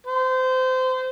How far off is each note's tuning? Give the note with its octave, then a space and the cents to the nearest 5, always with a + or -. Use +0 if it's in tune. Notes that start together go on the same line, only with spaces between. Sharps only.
C5 -25